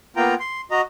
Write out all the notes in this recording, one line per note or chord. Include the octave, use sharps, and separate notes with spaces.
A#3 B3 F4 G5 A#5
C6
F#4 D#5 A#5